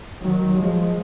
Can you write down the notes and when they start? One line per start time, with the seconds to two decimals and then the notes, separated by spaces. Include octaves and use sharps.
0.22 D#3 F#3
0.58 F3 G#3